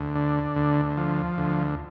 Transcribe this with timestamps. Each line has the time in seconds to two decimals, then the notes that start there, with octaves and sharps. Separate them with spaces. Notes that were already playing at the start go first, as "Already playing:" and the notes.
Already playing: D2
0.15 D3
0.56 D2
0.97 F3
1.38 D2